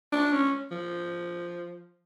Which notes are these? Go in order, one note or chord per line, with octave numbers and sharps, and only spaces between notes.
D4
C#4
F3